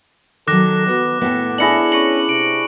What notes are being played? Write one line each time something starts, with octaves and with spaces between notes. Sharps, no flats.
D#3 F#3 A4 D6 F#6 A#6
B3 F#4 D#5
A2 B3 A4 G5
D4 E4 G#4 A#6 C#7 F#7
C#4 C#6 C#7 F#7
C3 D7